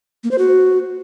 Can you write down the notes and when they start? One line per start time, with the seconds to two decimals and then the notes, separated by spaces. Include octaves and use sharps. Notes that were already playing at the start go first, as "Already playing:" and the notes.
0.24 A#3
0.31 C5
0.38 F#4